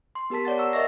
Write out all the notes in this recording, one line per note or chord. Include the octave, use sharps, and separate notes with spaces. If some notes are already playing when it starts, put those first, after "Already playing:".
C6
B3 G4 A#4 A5 B6
C#5 D5 F#5 A6
F#5 A#5 C#6 E6
A#4 D#5 E5 C#6 E6 A#6